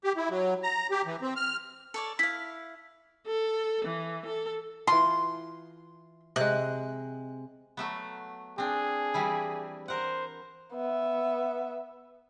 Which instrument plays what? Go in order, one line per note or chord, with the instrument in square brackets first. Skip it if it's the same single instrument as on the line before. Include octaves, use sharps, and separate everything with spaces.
[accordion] G4
E4
F#3
A#5
G4
E3
C4
F6
[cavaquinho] A4 C#5 D5
[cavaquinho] E4 F5 [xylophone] B6
[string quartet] A4
E3
A4
[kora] E3 F4 [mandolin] C6
[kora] C3 G#3 [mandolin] F#6
[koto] F#3 A3 B3
[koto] C4 D4 [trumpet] G#4
[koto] E3 G3 E4
[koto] A#4 F#5 [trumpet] C5
[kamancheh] B3 E5